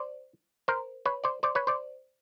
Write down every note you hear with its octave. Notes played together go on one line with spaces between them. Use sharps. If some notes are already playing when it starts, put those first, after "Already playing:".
Already playing: C5 D5
A#4 C5
B4 C#5
C5 D5
C5 D5
B4 C#5
C5 D5